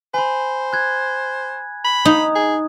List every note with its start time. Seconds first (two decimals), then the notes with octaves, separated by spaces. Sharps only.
0.14 C5 G#5 B5
0.73 F#6 G#6
1.84 B5
2.05 D#4 D#6
2.35 G#4